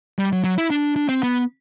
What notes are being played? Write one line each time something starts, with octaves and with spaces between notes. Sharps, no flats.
G3
F#3
F#3
E4
D4
D4
C4
B3